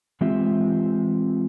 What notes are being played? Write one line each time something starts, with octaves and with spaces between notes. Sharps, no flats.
E3 G#3 C4 F4 G4 E5